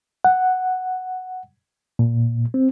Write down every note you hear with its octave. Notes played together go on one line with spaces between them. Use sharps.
F#5
A#2
C4